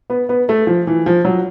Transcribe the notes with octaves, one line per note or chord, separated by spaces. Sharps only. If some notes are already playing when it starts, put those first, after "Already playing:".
B3
B3
A3
F3
E3
F3
F#3